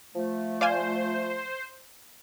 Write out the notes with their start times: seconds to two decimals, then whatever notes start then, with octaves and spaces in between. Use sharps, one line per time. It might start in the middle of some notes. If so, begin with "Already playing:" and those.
0.15 F3 A3
0.61 C5 D5 F5 G#5